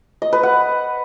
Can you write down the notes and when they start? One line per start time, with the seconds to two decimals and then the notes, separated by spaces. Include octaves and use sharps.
0.22 D#5
0.33 B4
0.43 F#5